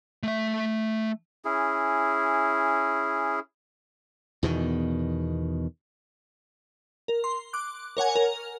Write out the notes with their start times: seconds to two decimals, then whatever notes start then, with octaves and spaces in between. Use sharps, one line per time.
0.23 A3 E5
1.45 C#4 E4 G#4
4.43 E2 B2 D#3
7.08 A#4
7.24 C6
7.53 D6 F#6
7.97 A#4 C#5 F#5 G#5
8.16 A#4